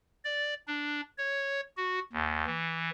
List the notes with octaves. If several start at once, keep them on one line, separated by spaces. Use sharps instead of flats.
D5
D4
C#5
F#4
D#2
E3